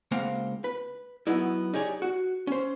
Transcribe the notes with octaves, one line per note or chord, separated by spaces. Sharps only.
C#2 A#3 C4 F5 F#5
B4
F#3 B3 D#4 E4
D#4 G4 G#4 C#5 D5
F#4
C#4 C5